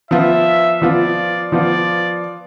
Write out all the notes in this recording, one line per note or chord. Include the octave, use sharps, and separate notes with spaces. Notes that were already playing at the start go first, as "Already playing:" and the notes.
F3 B3 F4 E5
F3 B3 F4 D5
F3 B3 F4 D5